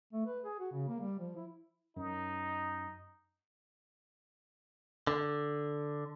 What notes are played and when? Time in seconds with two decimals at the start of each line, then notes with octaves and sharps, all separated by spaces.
0.13 A3
0.26 B4
0.44 G#4
0.59 F#4
0.72 C#3
0.88 A#3
1.00 G3
1.19 F3
1.36 E4
1.97 F#2 D#4
5.07 D3